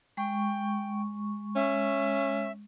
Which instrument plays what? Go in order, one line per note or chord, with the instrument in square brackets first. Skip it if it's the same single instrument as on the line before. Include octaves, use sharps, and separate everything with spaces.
[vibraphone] G#3 C#6 [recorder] G5
[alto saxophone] C#4 [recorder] E5